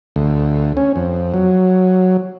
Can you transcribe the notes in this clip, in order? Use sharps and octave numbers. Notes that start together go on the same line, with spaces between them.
D2
C#4
F2
F#3